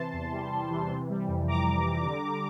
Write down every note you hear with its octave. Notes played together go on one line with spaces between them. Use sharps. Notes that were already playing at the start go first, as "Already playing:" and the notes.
Already playing: C3 E3 A5 C6
E2
G3
C3
E3
C3
G3
F2
F2 A#5 D6
C3
G3
D3
G3